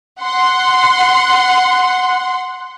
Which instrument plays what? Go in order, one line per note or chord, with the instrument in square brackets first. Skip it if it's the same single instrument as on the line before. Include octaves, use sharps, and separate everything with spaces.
[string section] F#5 C6